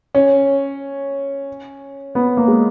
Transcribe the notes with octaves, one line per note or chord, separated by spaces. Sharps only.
C#4
B3
A#3
G#3